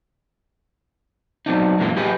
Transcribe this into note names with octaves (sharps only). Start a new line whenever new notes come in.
F#3 B3 C4 D4 D#4
F#2 A#2 E3 G#3 A#3 F4
G4 G#4 B4 D#5